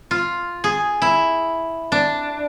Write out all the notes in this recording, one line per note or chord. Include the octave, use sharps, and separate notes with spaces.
F4
G#4
E4
D4